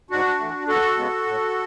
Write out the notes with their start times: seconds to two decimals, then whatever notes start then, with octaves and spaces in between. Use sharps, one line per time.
0.11 G#2 D4 F#4
0.39 E3 A3
0.68 E2 F#4 A4
0.97 C#3 G#3 B3
1.26 A2